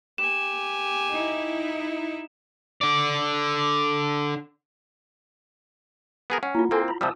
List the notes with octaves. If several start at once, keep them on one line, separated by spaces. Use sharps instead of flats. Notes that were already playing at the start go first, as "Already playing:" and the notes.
G4 G#5 E7
D#4 E4
D3 D5
B3 G#4 A#4
C#4 F#5
A#3 E4 F4
A#3 C4 A4 G#5 C6
A#5 B5
C3 F3 G3 A5 D#6 E6